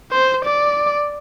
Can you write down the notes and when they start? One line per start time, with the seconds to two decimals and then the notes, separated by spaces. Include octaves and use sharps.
0.12 C5
0.45 D5